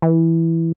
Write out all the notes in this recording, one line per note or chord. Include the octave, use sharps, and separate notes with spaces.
E3